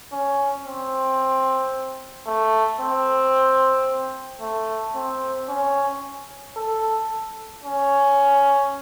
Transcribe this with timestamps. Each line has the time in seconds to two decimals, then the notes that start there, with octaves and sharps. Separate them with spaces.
0.12 C#4
0.66 C4
2.27 A3
2.81 C4
4.42 A3
4.95 C4
5.49 C#4
6.57 A4
7.64 C#4